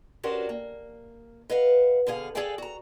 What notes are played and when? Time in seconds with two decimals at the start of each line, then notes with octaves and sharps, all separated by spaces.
0.24 C#4 D4 F#4 G4 A#4 C5
0.49 A#3
1.50 B4 D#5 F5 F#5
2.07 B2 D3 G#4 F5
2.35 G#4 A4 D5 F5 G5 G#5
2.58 F#4 A#5